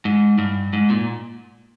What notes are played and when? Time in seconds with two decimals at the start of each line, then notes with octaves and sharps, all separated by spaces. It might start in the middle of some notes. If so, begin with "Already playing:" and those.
0.05 G#2
0.38 G2
0.73 G#2
0.90 A#2